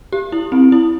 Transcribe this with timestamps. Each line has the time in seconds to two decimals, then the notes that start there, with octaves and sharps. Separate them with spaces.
0.13 G4
0.32 E4
0.52 C4
0.72 E4